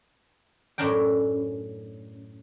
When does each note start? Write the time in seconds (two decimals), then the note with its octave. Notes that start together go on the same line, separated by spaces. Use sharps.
0.78 F#2 A2 C#4 D4 A#4 G5